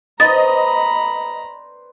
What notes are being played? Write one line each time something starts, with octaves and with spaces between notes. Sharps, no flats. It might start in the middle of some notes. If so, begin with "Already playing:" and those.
B4 C5 D5 D#5 A#5 B5 A6